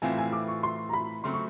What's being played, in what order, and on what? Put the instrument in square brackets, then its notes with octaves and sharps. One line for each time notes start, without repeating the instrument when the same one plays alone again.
[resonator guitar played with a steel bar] A2 E3 A3 C4 F4 [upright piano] G#5
[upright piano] G#5
D6
C#6
C6
A#5
B5
[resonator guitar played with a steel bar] C#3 F#3 A3 C4 [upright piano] C6
[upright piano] C#6